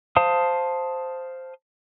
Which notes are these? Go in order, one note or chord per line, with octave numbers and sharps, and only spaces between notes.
C5 F5 A5 D#6